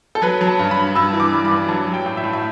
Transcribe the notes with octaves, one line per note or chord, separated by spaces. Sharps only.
A4
F#3 B4
F#3
A5
G2
B5
G2
G2 E6
E3
D6
G3
B5
G2
F#3 A5
F#3
G5
A2
E5
A2
E5